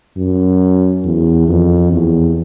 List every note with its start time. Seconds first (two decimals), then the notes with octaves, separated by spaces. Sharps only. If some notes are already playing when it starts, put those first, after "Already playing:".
0.17 F#2
1.05 E2
1.48 F2
1.92 E2